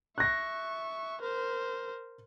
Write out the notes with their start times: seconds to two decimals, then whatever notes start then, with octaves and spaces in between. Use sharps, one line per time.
0.18 E5 C#6 F#6 A#6
1.21 A#4 C5